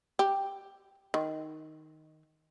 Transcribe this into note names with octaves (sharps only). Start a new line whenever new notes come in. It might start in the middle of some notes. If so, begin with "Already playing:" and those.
G4
D#3